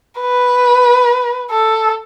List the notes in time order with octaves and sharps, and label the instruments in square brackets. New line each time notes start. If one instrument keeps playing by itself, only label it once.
[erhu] B4
A4